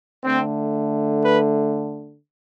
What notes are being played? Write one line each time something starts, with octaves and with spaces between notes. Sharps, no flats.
D3 A3 C4
B4